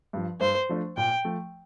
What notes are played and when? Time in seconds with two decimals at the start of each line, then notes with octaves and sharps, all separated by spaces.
0.13 G2 F3
0.40 G2 C5
0.69 F3 A3 D4
0.97 A#2 G5
1.24 F3 A3